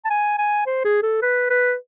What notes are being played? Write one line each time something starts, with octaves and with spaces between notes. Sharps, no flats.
A5
G#5
G#5
C5
G#4
A4
B4
B4